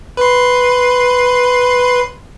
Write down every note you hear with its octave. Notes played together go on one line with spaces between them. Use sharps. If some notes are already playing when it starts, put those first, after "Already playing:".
B4 C6